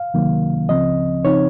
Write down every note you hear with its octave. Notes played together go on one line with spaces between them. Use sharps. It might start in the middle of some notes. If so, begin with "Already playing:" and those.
Already playing: F5
C#2 C3 D#3 F#3 A#3
C#2 C#3 F3 C4 D#5
C#3 F3 C4 D#4 C#5